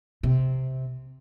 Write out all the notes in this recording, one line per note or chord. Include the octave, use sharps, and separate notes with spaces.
C3